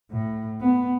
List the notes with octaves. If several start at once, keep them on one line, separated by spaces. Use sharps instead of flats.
A2
B3